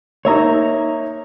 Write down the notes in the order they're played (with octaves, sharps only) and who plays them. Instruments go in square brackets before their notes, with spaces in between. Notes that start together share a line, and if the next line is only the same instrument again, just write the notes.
[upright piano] A#3 D#4 [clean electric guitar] C#5 E5 A#5